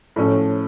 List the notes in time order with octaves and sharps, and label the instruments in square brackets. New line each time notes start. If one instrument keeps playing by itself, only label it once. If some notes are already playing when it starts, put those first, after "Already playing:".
[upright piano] A2 F3 A3 C#4 A4